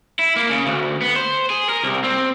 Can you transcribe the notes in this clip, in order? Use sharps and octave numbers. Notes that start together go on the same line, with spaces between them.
E4
A#3
C#3
D2
B3
C5
G#4
A#4
C2
C4